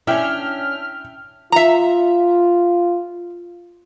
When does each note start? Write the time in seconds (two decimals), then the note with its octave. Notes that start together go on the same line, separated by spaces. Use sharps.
0.07 C#4 D4 E4 E5 G5 F6
1.52 F4 E5 A#5